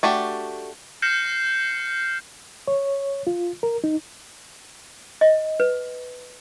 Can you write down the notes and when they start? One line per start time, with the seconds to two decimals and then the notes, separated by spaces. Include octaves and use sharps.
0.03 A3 D4 F#4 G4
1.02 F6 G6 A#6 C7 C#7 E7
2.68 C#5
3.27 F4
3.63 A#4
3.84 D#4
5.21 D#5
5.60 B4